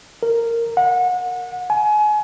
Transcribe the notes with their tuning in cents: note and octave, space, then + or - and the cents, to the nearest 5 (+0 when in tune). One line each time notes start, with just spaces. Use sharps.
A#4 -10
F#5 -30
G#5 +30